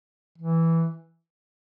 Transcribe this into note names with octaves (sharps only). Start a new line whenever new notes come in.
E3